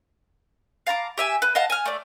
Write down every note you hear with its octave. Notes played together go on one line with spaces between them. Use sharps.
F5 A5 A#5 D6
G4 E5 G#5
B4
D#5 F5 F#5 A5
G#5 F6
A3 D5